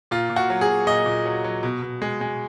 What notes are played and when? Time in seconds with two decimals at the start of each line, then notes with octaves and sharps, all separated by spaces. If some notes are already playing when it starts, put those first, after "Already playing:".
0.11 A#2 F4
0.30 A#2
0.36 F#4
0.50 F#3
0.61 G#4
0.69 F#3
0.87 A#2 D#5
1.06 A#2
1.25 F#3
1.44 F#3
1.63 B2
1.82 B2
2.02 G#3
2.21 G#3